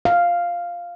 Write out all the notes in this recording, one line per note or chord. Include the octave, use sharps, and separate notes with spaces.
F5